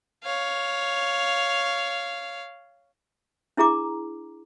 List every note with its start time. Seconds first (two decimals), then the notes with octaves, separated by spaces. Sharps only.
0.24 C#5 F5
3.57 D4 E4 G#4 A#5 D6